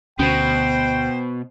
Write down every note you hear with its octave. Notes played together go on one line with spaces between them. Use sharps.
D2 B2 C#4 C5 G5